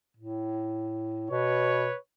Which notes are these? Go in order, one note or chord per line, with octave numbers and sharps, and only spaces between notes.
A2
B2 B4 C#5